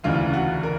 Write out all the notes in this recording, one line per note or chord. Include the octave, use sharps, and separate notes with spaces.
E1 D2 C#3 E3 F4
F#4
A#4